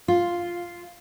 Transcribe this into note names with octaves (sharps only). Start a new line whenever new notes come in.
F4